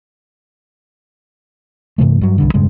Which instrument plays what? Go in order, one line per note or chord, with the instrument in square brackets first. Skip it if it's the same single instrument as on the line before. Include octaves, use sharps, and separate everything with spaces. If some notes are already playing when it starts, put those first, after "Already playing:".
[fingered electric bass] G2 C3 E3 A3
G2 F#3
C2 G2 D3
E1 G2 C#3 G#3